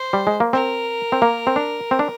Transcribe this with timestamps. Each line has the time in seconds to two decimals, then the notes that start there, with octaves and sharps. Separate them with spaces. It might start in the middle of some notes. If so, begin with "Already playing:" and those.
Already playing: C5
0.13 G3
0.27 G#3
0.40 A#3
0.53 C4 A#4
1.12 C4
1.22 A#3
1.47 C4
1.56 D4
1.91 C4
1.99 D4